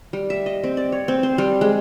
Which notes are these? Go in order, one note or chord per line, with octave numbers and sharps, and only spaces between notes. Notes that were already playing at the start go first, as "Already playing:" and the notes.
G3
E5
D#5
C4
D5
C#5
C4
C5
G3
G#3